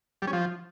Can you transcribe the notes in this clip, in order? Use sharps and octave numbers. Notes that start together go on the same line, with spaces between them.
G3
C#4
F3